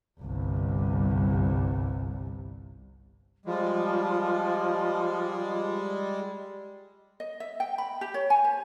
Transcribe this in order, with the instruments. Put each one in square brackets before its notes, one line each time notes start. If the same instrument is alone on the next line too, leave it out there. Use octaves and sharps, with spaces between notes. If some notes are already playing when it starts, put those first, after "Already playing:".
[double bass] G1 C2
[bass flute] F3 [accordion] G3 G#3
[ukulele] D#5
E5
G5
B5
G4
C#5
G#5
C5